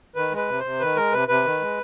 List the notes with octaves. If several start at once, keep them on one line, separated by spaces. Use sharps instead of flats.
D#3 B4
G#3
B4
C3
C5
C3
D#3 B4
G#3 A#4
C3 B4
C3 B4
D#3
G#3